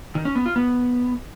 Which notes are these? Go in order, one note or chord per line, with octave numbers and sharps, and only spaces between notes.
D#3
C#4
B3
F4
B3